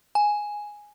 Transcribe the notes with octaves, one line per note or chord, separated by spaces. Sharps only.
G#5